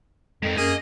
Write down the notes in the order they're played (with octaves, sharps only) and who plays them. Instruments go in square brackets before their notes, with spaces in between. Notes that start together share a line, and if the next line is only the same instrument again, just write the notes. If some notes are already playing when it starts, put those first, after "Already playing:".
[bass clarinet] F2 [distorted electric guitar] G#2 A#4
[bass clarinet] F#2 [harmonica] A#3 G#4 [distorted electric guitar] D#5